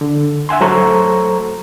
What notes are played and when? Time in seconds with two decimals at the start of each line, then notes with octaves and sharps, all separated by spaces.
0.01 D3
0.49 E5 F#5 G#5 C6
0.61 F#3 A3 A4 C5 A#5 C#6